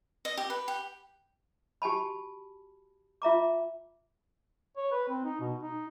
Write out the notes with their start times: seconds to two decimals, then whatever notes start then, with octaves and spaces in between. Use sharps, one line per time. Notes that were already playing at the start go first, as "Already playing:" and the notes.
0.25 D#5
0.38 G4
0.50 B4
0.68 G4
1.82 F#4 G4 G#5 A5 B5
3.22 F4 E5 A#5 D6
4.77 C#5
4.91 B4
5.09 C4
5.24 D#4
5.40 B2
5.62 D#4